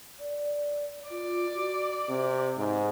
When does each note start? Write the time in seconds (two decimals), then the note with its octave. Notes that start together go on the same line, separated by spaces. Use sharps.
0.19 D5
1.10 F4 D5
1.54 F#4
2.09 C3 C4
2.57 G#2